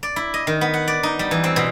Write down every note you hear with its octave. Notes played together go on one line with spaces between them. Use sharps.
D5
E4
D#5
D#3
B3
F#5
D5
D#4
G3
E3
C4
B2